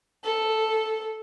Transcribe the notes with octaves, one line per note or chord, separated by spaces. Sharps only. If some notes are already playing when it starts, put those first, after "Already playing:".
A4